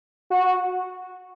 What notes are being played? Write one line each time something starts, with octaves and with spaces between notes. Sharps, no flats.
F#4